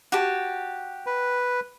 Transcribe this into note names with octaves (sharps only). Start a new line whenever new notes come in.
F#4 G4 A5
B4